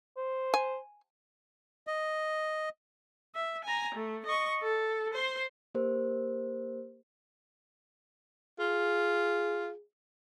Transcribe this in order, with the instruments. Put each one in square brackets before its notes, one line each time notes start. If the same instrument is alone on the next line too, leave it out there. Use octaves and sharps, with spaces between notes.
[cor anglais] C5
[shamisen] G#5
[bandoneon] D#5
[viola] E5
G#5 A#5
A3
D#5 C#6
A4
C5 C6
[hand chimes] A#3 G4 A#4 C5
[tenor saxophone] F4 [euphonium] G#4